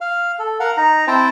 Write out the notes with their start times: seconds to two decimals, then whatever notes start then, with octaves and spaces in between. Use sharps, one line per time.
0.01 F5
0.39 A4
0.60 A#4 F5 F#5
0.77 D#4 A#5
1.07 C4 E4 C5 G5 A5